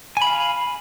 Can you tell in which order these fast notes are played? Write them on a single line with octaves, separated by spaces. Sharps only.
G#5 B5 F5